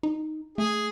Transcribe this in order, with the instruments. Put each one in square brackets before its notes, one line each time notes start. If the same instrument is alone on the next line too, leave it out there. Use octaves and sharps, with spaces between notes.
[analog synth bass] D#4
[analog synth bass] A3 [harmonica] G#4